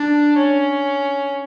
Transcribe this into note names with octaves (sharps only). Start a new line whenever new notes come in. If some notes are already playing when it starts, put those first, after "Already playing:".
Already playing: D4
C#4